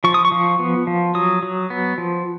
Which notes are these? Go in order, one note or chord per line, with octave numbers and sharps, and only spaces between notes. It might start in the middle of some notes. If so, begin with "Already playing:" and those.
F3 C#6
D#6
C#6
F3
B3
F3
F#3 D#6
F#3
B3
F3